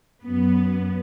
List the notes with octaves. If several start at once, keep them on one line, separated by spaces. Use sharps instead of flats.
F#2 B3